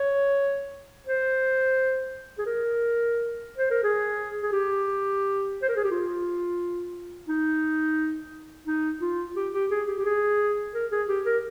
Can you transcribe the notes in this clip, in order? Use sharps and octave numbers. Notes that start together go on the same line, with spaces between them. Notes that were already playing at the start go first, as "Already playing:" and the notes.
Already playing: C#5
C5
G#4
A#4
C5
A#4
G#4
G#4
G4
C5
A#4
G#4
G4
F4
D#4
D#4
F4
G4
G4
G#4
G4
G4
G#4
A#4
G#4
G4
A#4